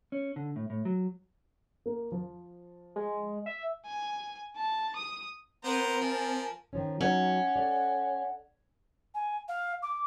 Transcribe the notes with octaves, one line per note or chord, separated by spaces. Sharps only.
C#4
D3
A2
A2
F#3
A#3
F3
G#3
E5
G#5
A5
D#6
B3 C4 A#4 C5 A#5
F3 G#5 A5
D#3 F3 C#4
F#3 C#4 D#4 F#5
A4 D5
G#5
F5
D6